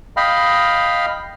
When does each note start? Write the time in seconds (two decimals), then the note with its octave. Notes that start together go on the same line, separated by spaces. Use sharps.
0.17 D#5 F5 G5 B5 F6